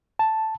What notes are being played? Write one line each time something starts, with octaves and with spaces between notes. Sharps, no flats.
A5